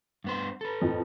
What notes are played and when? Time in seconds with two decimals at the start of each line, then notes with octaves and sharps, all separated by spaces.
0.24 G2 B3 C5
0.61 A4 B4
0.82 F2 A2